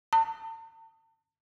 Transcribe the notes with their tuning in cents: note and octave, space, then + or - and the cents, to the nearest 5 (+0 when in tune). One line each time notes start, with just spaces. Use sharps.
A5 +40